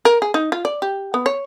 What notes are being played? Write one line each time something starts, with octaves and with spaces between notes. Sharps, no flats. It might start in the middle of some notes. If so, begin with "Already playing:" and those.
A#4
G#4
D#4
F4
D5
G4
B3
C#5